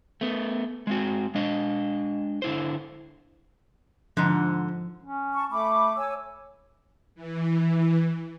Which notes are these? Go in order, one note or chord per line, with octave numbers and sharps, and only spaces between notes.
A3 B3
G#3 C4 F#4
G#3 D4 D#5
D3 E4 C5
G#2 D3 F3
C#4
A5 C#6
A3 B5 D6
C#5 G#5 E6
E3